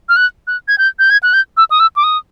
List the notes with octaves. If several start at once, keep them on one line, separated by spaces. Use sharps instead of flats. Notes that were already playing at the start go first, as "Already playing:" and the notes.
F6
F#6
F#6
G#6
G6
G6
G#6
F#6
G6
E6
D#6
E6
D6
D#6